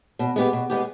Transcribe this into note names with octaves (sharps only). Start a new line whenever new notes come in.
B2
G#3 B3 G4
B2
G#3 B3 G4